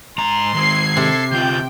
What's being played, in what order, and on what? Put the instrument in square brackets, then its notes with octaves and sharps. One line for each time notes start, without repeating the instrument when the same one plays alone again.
[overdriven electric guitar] G#2 A#5 [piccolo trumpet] C6
[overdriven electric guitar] D#3 G#3 [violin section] G#6 C7
[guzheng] C3 [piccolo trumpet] A4
[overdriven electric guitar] D2 F4 [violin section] G5 [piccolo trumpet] G6